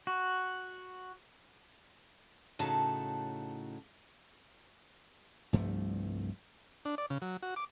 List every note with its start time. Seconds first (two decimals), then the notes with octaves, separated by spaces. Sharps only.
0.07 F#4
2.59 A2 C#3 D#4 F#4 A4 A5
5.53 C2 G2 F3 A3
6.85 D4
6.98 D5
7.10 C#3
7.22 F#3
7.43 F#4
7.56 D6